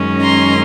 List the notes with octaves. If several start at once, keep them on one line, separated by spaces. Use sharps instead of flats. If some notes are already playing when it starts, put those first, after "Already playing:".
Already playing: F#2 D#3 G#3 C#4
A#5 C6